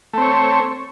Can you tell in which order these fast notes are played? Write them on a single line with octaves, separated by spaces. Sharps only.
A3 C4 C#5